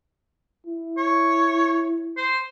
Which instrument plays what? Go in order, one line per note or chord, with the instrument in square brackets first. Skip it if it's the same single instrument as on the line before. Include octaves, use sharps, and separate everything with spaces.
[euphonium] E4
[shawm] C#5
C5